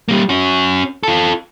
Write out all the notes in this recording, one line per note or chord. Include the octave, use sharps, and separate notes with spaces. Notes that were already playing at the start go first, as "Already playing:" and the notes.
G3 A#3
C#4 F#4
F4 A4